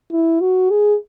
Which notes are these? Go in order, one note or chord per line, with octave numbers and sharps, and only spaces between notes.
E4
F#4
G#4